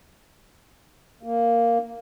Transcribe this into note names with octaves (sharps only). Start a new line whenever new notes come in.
A#3